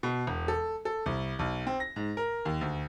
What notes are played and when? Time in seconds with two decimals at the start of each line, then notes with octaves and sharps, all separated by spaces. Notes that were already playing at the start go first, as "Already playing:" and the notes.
0.03 B2
0.27 E1
0.48 A4
0.85 A4
1.06 C2
1.39 B1
1.67 C4
1.80 A#6
1.96 G#2
2.17 A#4
2.45 D#2
2.61 D2